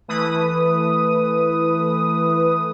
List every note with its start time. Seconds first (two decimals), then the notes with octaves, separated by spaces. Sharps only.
0.08 E3 A3 B4 D#6